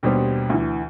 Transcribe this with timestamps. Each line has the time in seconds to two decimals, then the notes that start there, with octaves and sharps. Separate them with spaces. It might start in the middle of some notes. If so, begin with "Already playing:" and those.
0.03 D#2 B2 G3 D4 C5
0.50 D2 E3